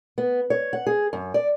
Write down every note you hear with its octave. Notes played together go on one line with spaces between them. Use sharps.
B3
C#5
F#5
G#4
F#2
D5